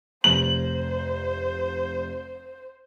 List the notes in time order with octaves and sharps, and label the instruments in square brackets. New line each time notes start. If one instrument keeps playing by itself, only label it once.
[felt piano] F1 [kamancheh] C5 [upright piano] F#7